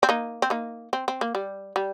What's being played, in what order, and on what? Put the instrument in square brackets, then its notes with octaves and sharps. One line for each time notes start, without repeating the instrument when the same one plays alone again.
[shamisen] C4
A#3 D#4
C4
A#3 D#4
C4
C4
A#3
G3
G3